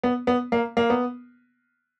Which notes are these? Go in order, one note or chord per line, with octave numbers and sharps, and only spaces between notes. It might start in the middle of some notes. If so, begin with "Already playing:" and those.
B3
B3
A#3
A#3
B3